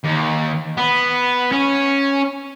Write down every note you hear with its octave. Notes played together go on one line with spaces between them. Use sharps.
D#2
B3
C#4